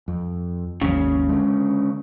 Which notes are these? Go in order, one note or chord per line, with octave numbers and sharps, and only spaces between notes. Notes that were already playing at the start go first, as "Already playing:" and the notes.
F2
G#1 D#2 C#3 F#3
D3 G#3